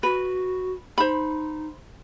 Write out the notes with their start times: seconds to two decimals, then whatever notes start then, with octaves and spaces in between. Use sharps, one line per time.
0.03 F#4 B4
0.98 D#4 C5 B5